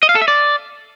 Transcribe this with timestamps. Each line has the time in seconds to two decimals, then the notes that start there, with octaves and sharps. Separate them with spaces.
0.03 D#5
0.09 F5
0.15 A4
0.22 E5
0.28 D5